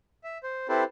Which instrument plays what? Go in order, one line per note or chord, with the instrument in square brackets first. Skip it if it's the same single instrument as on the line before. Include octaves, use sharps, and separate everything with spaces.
[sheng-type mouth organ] E5
C5
C4 E4 G4 A4 B4 C5